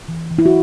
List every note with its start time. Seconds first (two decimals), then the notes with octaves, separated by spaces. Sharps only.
0.08 E3
0.31 E3
0.38 E4
0.46 F#4